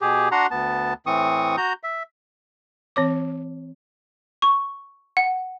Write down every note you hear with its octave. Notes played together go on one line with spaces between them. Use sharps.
B2 G4 G#4
D4 F#4 F#5 A#5 C6
D2 B3 A5
A2 E3 C4 C#6 D#6
F#4 A#5 G6
E5
E3 C4 C#5 D6
C#6
F#5